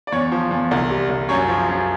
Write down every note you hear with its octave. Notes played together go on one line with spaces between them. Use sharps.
D5
E2 C#5
F3
E2
C2
G3
C2
F#2 C#5
F3
F#2